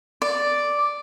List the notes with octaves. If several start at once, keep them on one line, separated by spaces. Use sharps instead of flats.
D5